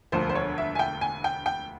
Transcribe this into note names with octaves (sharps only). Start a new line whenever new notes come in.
E1 D2 D3 F3 C5
C5
C#5
E5
G#5
G5
G#5
G5
G5